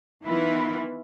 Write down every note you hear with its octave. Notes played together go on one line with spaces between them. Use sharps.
D#3 E3 B3 E4 F4 B4